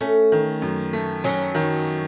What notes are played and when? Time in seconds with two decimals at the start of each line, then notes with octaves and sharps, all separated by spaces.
0.01 A3 C#4
0.32 D#3
0.62 F#2
0.93 A3
1.24 F#3 C#4
1.55 D#3